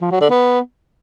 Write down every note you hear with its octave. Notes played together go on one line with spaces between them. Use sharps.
F3
F#3
D3
B3